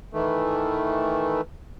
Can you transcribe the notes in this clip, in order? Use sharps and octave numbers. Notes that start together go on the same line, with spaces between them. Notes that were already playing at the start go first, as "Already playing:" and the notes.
D#3 E3 A3